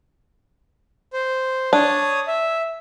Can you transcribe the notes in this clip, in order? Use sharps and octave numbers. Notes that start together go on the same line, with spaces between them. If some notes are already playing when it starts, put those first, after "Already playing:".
C5
D4 C#5 D#6
E5